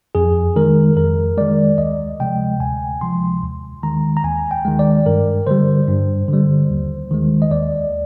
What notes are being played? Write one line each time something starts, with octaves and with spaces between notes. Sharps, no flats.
F2 G#4
D#3 G#3 A#4
F2 A#4
D#3 G#3 D5
D2 D#5
C3 F3 G#3 G5
D2 G#5
C3 F3 G#3 C6
D#2
D#3 G#3 A#5
A#5
D#2 G#5
G5
D#3 G#3
D5
G2 A#4
D3 G3 C5
G2
D3 G3
D#2
D#3 G#3
D#5
D#2 D5